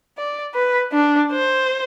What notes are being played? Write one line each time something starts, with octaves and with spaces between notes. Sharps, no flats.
D5
B4
D4
C5